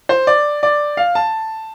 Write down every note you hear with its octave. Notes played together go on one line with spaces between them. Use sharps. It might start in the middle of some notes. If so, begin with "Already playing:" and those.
C5
D5
D5
F5
A5